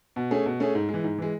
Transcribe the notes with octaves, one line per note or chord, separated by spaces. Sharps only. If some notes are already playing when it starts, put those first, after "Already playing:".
B2
A3 C#4 G#4
B2
A3 C#4 G#4
G#2
E3 G#3
G#2
E3 G#3